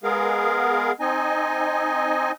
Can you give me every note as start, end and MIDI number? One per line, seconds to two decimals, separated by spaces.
0.04 0.92 56
0.04 0.92 59
0.04 0.92 68
0.04 0.92 70
0.04 0.92 77
1.00 2.31 60
1.00 2.31 63
1.00 2.31 75
1.00 2.31 80